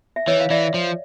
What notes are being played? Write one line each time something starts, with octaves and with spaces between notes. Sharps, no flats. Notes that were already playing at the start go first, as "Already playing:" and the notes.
E5
E3 C#5 D#5
F5
E3 D5 E5
F3